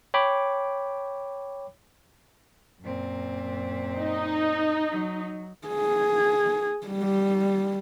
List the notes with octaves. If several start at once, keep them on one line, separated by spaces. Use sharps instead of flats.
C#5 G5 B5 D6
F#2 A#2 C4
D#4
F#3
G#4
G3